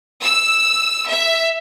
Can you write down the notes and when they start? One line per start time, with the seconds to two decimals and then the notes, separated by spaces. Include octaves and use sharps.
0.22 E6
1.07 E5